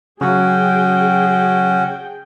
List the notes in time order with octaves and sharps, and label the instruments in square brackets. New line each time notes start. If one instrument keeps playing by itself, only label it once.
[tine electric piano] C#3 F#3 [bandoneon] C#4 F#4 [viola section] G#4 G5